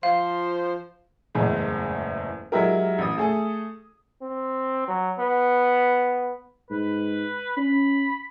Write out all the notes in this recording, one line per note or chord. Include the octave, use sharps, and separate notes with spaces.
F3 C5 F5
F#1 E2 A2 G#3
F#3 G#3 E4 G4 A#4
A1 D#6
A3 G#4 A4
C4
F#3
B3
G#2 B4
C#4 B5